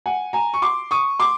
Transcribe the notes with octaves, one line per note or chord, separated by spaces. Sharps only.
F#5 G#5
G#5 A#5
C#6
C6 D6
C#6 D#6
C6 D6